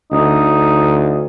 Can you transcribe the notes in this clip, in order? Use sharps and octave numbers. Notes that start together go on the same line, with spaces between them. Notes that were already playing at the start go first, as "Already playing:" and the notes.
D2 D#4